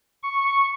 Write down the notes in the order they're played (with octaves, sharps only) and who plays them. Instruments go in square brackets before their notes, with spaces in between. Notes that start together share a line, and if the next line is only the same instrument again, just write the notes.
[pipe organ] C#6